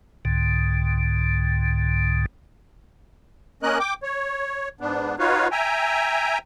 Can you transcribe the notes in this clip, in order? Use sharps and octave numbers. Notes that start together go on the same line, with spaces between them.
C2 G#2 D3
A#3 C#4 A#4 D#5 F#6
G5 D6
C#5
G#2 B3 D4
D#4 F4 F#4 B4 C#5 F5
E5 G5 G#5 A#5